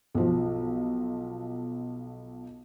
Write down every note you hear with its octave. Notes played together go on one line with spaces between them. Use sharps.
B1 F3